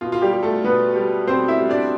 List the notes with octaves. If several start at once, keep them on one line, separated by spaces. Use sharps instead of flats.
B2 F4
F4
G3 G4
G3
A3 A4
B2 B3 B4
G3
B2 C4 C5
E4 E5
G3
D4 D5